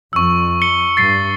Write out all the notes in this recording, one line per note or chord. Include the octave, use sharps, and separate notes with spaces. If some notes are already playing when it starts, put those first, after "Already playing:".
F2 C#6 E6
C#7 G7
G2 A6 C7 C#7